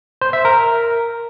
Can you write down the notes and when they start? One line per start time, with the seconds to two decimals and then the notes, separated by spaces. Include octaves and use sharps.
0.21 C5
0.33 E5
0.45 A#4